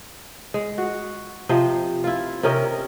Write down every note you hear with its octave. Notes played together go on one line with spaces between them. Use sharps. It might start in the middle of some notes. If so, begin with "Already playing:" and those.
G#3
F#4
C3 F3 C5 D#5
E4 F4
C3 C#4 A#4 D#5